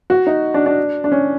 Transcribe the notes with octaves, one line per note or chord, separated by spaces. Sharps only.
F#4
D#4
D4
D4
D4
C#4